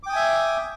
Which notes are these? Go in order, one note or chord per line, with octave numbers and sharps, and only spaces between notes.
E5 G5 G#5 D6 D#6